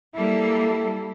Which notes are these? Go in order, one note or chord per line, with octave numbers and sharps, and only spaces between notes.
G3 A#3 E4 A4